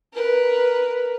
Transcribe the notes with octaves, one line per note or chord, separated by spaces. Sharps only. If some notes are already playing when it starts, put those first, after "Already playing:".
A#4 B4